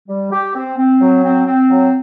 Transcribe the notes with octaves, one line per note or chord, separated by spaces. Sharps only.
G3
G4
C4
C4
F#3
C4
C4
F#3